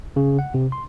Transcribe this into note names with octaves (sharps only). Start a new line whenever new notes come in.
C#3
F#5
C3
C6